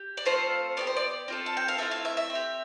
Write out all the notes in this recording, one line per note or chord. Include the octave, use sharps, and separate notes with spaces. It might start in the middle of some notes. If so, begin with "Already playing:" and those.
Already playing: G4
D5
A3 C4 F4 A4 C5
B3 D4 G4 D5
C5
D5
C4 F4 A4
A5
G5
F5
A3 C4 E4 E5
F5
E5
E5
C4
G4